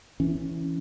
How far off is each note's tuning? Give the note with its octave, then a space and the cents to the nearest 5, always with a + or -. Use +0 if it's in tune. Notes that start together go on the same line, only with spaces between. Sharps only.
E3 +0 C#4 +0